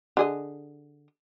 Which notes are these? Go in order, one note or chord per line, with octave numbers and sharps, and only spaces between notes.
D3 G#4 D#5